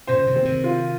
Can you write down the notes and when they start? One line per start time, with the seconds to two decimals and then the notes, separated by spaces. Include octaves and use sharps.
0.07 A#2 C#3 C5
0.27 C3 D#3
0.36 C4
0.45 C3 D#3
0.64 F4